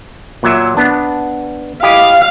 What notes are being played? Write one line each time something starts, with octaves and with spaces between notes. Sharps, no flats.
A#2 F#3 E5
B3 D4
E4 G4 D#5 F5